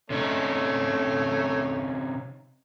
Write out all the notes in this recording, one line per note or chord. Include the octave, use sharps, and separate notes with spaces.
C3 A3 C#4 D#4 C#5